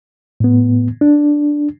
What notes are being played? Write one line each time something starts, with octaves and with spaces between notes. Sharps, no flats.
A2 B3
D4